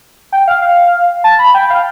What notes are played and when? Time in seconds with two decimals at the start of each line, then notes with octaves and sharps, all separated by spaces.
0.32 G5
0.48 F5
0.62 F5
1.24 A5
1.39 B5
1.54 G5
1.70 F5